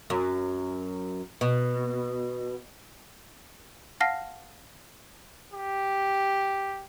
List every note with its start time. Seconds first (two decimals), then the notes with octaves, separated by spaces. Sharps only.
0.10 F#2
1.41 B2
4.00 F5 F#5 A5 F6 A#6 C7
5.53 G4